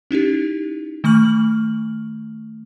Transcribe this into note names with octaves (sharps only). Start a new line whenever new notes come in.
C#4 D#4 E4 G4
D#3 A3 C#6 F6 F#7